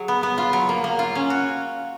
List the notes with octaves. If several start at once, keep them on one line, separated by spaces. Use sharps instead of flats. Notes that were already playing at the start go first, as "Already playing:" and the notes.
Already playing: F#3 G#4
B3
B3
F4
F#3
A#3
A#3
F4
C#4
F#4